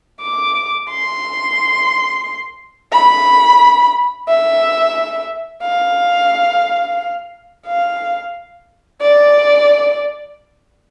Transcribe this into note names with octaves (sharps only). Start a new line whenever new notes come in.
D6
C6
B5
E5
F5
F5
D5